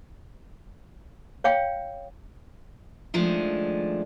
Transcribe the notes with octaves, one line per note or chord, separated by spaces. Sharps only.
C#5 F5 G5
D#3 F3 G#3 A3 D4